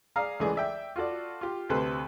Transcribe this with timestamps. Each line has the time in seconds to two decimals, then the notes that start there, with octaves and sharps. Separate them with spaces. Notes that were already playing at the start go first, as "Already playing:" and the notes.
0.16 G#4 D5 F5 A#5
0.40 C#2 E3 A3 G#4 D5
0.56 D5 E5 G5
0.96 F4 F#4 A4 D5
1.41 F4 G4
1.69 D2 C3 A4 B4 C5